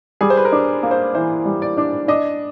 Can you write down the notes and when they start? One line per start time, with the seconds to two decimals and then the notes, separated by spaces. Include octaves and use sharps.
0.21 G3 G#4
0.30 C5
0.37 B4
0.45 A#4
0.52 D4
0.83 A#3
0.91 C5
1.15 E3 C5
1.45 G3
1.62 D5
1.77 D4
2.08 D4 D#5